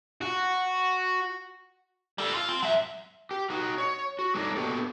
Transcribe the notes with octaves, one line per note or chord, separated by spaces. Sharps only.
F#4
G3 A4
F4
C4
F#3 E5
G4
D#4 F#4
C#5
F#4
G3 D4 D#4 A4 C#5 D#5
A#3 B3 D4 F#4 G4 A4